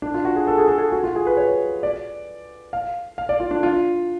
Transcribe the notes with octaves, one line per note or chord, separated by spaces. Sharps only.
D4
F4
F#4
G#4
A4
G#4
A4
G#4
F#4
F4
G#4
B4
C#5
D5
F5
F5
D5
F4
D4
F4